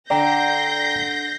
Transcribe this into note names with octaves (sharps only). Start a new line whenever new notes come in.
D3 D5 G5 A#5 G6 A#6 C7